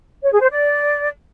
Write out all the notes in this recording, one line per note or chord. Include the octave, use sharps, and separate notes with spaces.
C#5
G#4
C5
D5